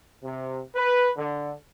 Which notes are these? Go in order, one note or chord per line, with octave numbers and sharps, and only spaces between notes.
C3
B4
D3